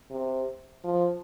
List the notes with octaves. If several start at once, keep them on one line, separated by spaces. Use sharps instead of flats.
C3
F3